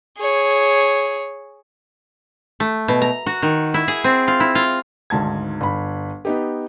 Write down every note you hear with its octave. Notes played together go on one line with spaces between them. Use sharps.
G#4 C#5
A3
B2
A#5
F#4
D#3
E4
G#4
C4
F4
E4
F4
G#1 D2 G#2 A5 G#6
G1 B5
B3 D#4 G4